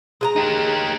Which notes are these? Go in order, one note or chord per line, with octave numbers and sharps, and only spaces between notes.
G#3 G#5 A#5
D#4 G4